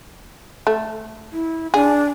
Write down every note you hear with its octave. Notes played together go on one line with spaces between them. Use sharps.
A3
E4
D4 G#4